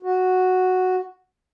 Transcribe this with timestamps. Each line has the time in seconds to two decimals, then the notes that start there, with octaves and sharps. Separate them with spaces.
0.02 F#4